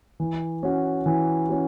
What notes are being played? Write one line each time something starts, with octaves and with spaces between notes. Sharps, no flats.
E3
C#4 F#4
E3
C#4 F#4